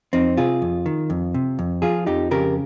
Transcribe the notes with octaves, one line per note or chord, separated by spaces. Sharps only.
F2 C4 D#4
C3 F4 G#4
F2
D#3
F2
C3
F2
F3 F4 G#4
F2 D#4 G4
C#3 G4 A#4